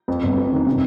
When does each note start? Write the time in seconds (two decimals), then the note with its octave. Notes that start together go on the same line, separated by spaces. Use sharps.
0.08 F2
0.23 G1
0.38 F2
0.52 D#3
0.67 C3